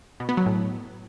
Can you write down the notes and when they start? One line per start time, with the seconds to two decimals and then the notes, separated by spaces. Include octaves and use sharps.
0.20 B2
0.29 B3
0.37 F#3
0.46 A2